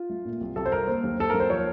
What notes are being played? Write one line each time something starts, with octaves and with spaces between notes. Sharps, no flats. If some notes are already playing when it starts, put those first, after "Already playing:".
Already playing: F4
A3
A#2
C2
C2 A4
C5
C2 A#4
A#3 C5
D#2
D#2 A4
D#2 A#4
C5
F3 C#5